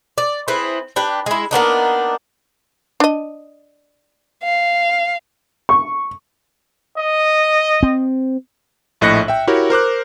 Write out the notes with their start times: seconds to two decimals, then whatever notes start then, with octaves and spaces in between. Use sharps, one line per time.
0.18 D5
0.48 C4 E4 G#4 B4
0.96 D4 G4 B4
1.26 G#3 E4
1.51 A#3 B3 D4 D#4
3.00 D4 D#5
4.43 F5
5.69 C#6
6.98 D#5
7.83 C4
9.01 A#1 A2 D#5 F#6 A#6 C#7
9.28 E5 G5
9.47 E4 F#4 G4 A#4 C#5
9.70 A#4 C5 D6 F#6